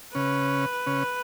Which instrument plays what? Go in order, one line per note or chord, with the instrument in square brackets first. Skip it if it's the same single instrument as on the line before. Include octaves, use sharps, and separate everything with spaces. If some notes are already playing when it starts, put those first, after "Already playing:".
[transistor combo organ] C#3 C#4 [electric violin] B4
[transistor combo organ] C#3 C#4